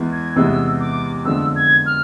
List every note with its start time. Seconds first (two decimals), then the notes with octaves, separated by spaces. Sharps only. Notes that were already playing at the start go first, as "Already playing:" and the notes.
Already playing: E2 G#3 B3 E4
0.13 G#6
0.36 E2 C3 G#3 B3 E4 E6
0.80 D6
1.25 F2 D3 F3 G#3 B3 E6
1.56 G#6
1.86 F6